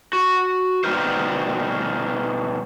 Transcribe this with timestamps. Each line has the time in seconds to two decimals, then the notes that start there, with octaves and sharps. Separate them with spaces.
0.13 F#4
0.84 B2 G3 B3 D#4 A#4 C5